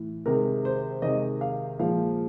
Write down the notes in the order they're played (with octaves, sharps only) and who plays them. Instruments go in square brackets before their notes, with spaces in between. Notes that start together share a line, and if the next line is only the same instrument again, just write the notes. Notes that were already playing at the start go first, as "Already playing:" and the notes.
Already playing: [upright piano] A2 E3
C3 D#3 G#3 A#4
C5
C3 D#3 G#3 D#5
F5
A#2 F3 G#3 F5